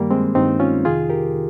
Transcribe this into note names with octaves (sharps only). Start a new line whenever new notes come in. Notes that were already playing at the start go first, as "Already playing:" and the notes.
Already playing: G2 D#3 G3 A#3
G#3 C4
G2 D#3 C4 D#4
C#4 F4
F2 C3 D#3 F4 G#4
G4 A#4
D#3